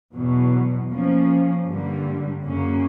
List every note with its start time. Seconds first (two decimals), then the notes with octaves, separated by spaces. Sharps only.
0.14 E2 B2 F#3
0.90 F3 A#3 C#4
1.66 G2 D3 G3 A#3
2.42 F#2 C#3 F#3 A#3 C#4